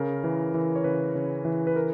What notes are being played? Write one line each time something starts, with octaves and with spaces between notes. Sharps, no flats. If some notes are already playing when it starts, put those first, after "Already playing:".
Already playing: C#3 A#4
E3
E3
C#5
C#3 B4
C#3
E3
B4
A#4